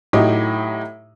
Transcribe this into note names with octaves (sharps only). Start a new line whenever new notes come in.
A2 F#3 D#4 E4 G4